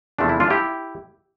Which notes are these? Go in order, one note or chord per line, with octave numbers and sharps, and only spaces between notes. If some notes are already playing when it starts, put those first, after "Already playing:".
E2 C3 F3 A3 D4
E4
D4 F4
E4 G4